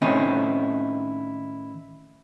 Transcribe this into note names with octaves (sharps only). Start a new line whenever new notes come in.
A2 D#3 C4 C#4 D#4 E4